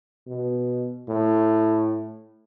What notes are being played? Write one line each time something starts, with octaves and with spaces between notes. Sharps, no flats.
B2
A2